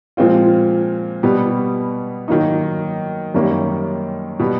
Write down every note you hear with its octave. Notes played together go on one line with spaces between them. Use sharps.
A#2 F3 G#3 C4 F4
B2 G3 B3
D#3 F#3 A#3 D#4
F#2 D#3 G3 A#3 C#4
B2 G3 B3